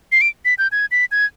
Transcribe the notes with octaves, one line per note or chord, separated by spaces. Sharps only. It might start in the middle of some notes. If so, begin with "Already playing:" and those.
C7
D7
B6
G6
G#6
B6
G#6